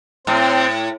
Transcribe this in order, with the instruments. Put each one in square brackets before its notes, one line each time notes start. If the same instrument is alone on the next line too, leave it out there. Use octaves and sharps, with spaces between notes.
[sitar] A2 [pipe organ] C4